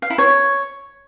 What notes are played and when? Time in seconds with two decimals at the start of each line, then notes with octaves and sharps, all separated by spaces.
0.02 F5
0.10 E4
0.18 C#5